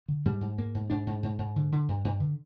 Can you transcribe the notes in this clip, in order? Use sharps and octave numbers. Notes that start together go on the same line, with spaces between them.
D3
G#2 G3
G#2
G#2 A#3
G#2
G#2 D4
G#2
G#2
G#2
D3
D3
G2
G2
D3